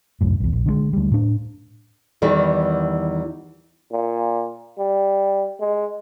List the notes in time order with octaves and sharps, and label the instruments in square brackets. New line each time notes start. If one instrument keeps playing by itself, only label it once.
[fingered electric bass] C2 F#2 A2
B1 E2
A#1
D3 D#3 G#3
D2 G3
A2 D4
[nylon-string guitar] E2 D#3 E3 G3
[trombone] A#2
G3
G#3